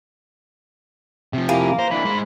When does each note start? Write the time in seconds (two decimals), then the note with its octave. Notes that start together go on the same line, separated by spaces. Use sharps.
1.33 C3 F3
1.49 A#3 E4 G4 G#5
1.79 C5 A#5
1.91 E3 D4 B5
2.05 G#3 C5